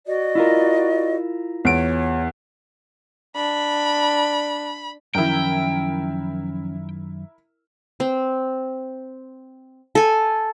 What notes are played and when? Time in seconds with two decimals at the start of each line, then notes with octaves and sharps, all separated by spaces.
0.06 F#4 D5 D#5
0.35 E4 F4 A#4
1.65 E2 C#5 D7
3.36 D4 B5
5.15 F#2 D#3 F3 C#4 E4 A#4 G5
8.00 C4
9.95 A4 G#5